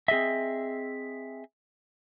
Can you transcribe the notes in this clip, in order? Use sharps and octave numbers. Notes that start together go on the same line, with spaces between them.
C4 G#4 D#5 E5